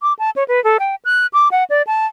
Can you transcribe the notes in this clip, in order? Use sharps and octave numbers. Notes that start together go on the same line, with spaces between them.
D6
A5
C#5
B4
A4
G5
F#6
D6
F#5
D5
A5